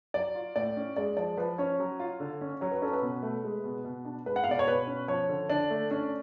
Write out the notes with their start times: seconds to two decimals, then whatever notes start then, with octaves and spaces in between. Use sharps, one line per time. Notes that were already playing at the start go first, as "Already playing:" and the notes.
0.14 F#3 D5
0.35 F4
0.56 A2 D5
0.77 C#4
0.96 G#3 D5
1.17 F3 D5
1.37 F3 B4
1.58 C#4 C#5
1.80 F#3
2.00 F4
2.20 D3
2.41 C#4
2.61 F#3 C#5
2.71 B4
2.82 C#4 A4
2.93 B4
3.02 B2
3.22 A3
3.44 G#3
3.64 B2
3.85 B2
4.05 D4
4.26 G#3 B4
4.36 F#5
4.44 F5
4.47 B2 D5
4.59 C#5
4.67 B2 B4
4.87 C#4
5.08 F3 C#5
5.29 D3
5.49 D3 D4
5.70 A3
5.91 C#4 D4